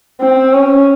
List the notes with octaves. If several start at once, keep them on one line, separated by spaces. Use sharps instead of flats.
C4
C#4